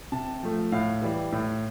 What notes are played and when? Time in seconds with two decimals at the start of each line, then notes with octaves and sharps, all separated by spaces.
0.12 C3 A5
0.43 F3 A3
0.72 A2 F5
1.02 E3 G3
1.32 A2